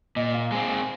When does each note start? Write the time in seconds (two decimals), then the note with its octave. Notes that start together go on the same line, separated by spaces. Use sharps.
0.16 A#2 D#5
0.34 F5
0.51 G#3 C4 G#5
0.69 G#5